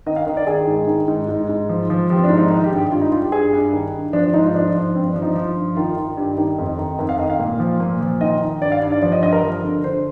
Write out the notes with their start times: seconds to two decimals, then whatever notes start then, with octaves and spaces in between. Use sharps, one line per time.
0.06 D#3 D#5
0.16 F5
0.27 D#3 D#5
0.37 D5
0.47 D#3 G#4
0.67 G#2
0.87 D#3
1.08 G#2
1.29 G#2
1.49 G#2
1.69 F3
1.90 F3
2.10 F3 G4
2.17 C4
2.24 D4
2.30 G#2
2.37 D#4
2.50 D#3 D#4
2.64 G4
2.71 G2
2.78 G4
2.91 G2 F4
3.02 D#4
3.12 G2 F4
3.22 G4
3.32 G2 G#4
3.53 G2
3.73 D#3
3.93 G2
4.13 F3 D4
4.24 D4
4.34 G#2 D#4
4.44 F4
4.54 F3 D4
4.75 F3
4.95 G2 C4
5.09 D4
5.16 F3
5.22 D#4
5.35 F3
5.56 G2
5.77 D#3 F4
5.97 D#3
6.17 G2 G4
6.38 D#3
6.58 F2
6.78 D#3
6.99 F2 A#4
7.09 F5
7.19 D#3 D#5
7.30 F5
7.39 A#2
7.60 F3
7.80 A#2
8.01 F3
8.21 D#3 D#5
8.41 D#3
8.62 G2 D5
8.72 F5
8.82 G2
8.92 D5
9.02 F3 D5
9.12 D#5
9.23 G2 D#5
9.33 A#4
9.43 F3
9.64 D3
9.84 D3 C5